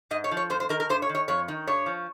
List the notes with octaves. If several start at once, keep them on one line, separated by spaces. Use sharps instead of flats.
G#2 D#5
C#5
F3
C#5
F2 C5
C5
D#3 A#4
A#4
G2 C5
C#5
D#3
C#5
F2 C#5
D#3
G2 C#5
F3